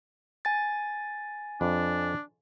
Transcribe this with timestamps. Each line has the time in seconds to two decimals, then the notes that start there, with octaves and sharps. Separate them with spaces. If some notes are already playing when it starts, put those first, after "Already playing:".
0.45 G#5 A6
1.61 F2 D4